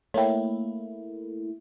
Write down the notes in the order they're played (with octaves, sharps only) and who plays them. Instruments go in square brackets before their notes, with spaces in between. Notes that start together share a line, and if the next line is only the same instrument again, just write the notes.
[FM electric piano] A3 A#3 E4 [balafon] C#5 G5